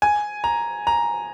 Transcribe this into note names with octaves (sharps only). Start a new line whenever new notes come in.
G#5
A#5
A#5